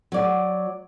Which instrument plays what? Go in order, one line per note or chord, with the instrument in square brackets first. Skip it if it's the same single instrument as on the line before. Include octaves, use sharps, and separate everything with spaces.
[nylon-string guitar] F#3 D5